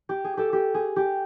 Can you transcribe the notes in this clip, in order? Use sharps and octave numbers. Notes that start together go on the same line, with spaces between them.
G4
G#4
G4 A4
G4
G#4
G4